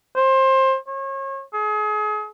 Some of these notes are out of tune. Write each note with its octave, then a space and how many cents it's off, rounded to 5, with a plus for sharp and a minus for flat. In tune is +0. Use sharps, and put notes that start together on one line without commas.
C5 +20
C#5 -35
G#4 +35